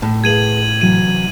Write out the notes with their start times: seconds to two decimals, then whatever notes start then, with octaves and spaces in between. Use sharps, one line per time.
0.02 A2
0.24 G#4 B4 F5 G#6 D#7 F#7
0.81 C3 E3 F#3 D#7